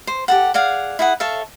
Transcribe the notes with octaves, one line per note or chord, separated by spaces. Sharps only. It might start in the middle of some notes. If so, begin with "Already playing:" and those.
C5
G4 A4 F#5
G#4 D5 F5 F#5
E4 G#4 F#5
A4 C#5 E5 F5